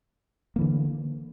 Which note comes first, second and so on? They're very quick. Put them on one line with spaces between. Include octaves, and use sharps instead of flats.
A#3 E3 D3